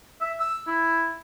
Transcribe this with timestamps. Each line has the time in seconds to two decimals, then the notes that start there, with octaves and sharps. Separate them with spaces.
0.21 E5
0.40 E6
0.67 E4